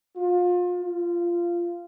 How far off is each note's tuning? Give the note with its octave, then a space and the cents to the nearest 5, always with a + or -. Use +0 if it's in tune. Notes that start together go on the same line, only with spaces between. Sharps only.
F4 +30
F4 -15